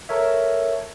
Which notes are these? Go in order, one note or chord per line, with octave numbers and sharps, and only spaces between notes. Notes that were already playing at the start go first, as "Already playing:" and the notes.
A4 A#4 C#5 E5